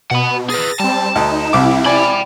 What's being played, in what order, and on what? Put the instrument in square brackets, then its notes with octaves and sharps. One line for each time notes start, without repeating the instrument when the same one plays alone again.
[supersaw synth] B2 [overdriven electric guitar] F#5 B5
[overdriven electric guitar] G#4 B4 [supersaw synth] A6 A#6
[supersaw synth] G3 C4 [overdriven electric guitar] A5
[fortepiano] D2 [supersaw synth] D#4
[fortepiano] C2 D6 [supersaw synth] C3 E4
[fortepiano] D5 G#5 [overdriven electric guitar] G5 B5